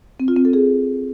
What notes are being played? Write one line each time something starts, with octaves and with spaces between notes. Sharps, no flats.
C4
F4
C4
A4
G#4